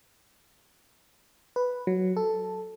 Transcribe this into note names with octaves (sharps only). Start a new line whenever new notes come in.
B4
F#3
A4